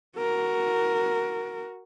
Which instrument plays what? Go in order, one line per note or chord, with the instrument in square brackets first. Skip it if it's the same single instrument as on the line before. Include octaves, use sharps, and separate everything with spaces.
[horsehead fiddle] F#4 A#4